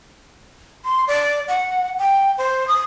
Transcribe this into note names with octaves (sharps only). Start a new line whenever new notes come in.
C6
D5
F#5
G5
C5
D#6